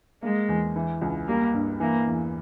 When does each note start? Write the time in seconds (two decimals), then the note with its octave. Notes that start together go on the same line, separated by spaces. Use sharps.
0.23 G#3 A#3
0.49 E2
0.76 E3
1.01 C#2
1.28 G3 A#3
1.54 G2
1.80 E3 A#3
2.07 E2